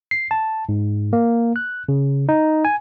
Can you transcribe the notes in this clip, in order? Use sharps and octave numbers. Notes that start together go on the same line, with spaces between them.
C7
A5
G#2
A#3
F#6
C#3
D#4
G#5